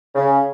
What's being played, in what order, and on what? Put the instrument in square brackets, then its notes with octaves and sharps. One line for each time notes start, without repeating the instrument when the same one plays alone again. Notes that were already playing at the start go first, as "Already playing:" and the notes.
[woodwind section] C#3